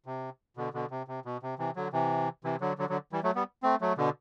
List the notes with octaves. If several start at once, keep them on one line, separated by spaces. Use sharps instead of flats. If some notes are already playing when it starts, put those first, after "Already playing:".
C3
B2 D3
B2 D3
C3
C3
B2
C3
C3 E3
D3 F#3
C3 E3
C3 E3
D3 F#3
D3 F#3
D3 F#3
E3 G3
F#3 A3
G3 B3
A3 C4
F#3 A3
B2 D3